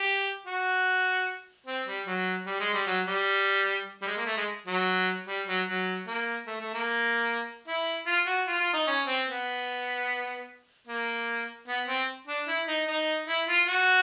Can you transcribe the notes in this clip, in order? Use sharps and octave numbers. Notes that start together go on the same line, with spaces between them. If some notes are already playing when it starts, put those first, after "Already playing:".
Already playing: G4
F#4
C4
G3
F#3
G3
G#3
G3
F#3
G3
G3
G#3
A#3
A3
G#3
F#3
G3
F#3
F#3
A#3
A3
A3
A#3
E4
F4
F#4
F4
F4
D#4
C#4
C4
B3
A#3
B3
C4
D4
E4
D#4
D#4
E4
F4
F#4